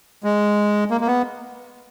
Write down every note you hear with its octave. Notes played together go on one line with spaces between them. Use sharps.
G#3
A#3
A#3
B3